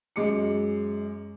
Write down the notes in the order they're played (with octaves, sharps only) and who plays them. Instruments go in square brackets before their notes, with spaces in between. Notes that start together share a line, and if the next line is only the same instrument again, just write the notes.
[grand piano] F#2 G#3 D6 C#7